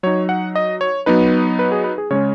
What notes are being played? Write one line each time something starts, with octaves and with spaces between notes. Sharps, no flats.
F#3 D#4 C#5
F#5
D#5
C#5
F#3 B3 D#4 B4
B4
G#4
B4
G#4
C#3 G#3 C#4 C#5